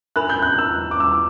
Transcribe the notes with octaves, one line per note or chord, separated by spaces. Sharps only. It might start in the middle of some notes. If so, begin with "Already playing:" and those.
D4 A#4 E5 B5 F#6
G6
F#6
E6
D6
E6